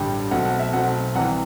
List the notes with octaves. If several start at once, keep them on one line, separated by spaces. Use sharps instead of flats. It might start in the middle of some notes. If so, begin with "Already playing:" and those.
Already playing: A1 G2 D3 G3
B1 B2 A3 C4 F#5
F#5
E5
B1 B2 A3 C4 F#5
C2 C3 E3 F#5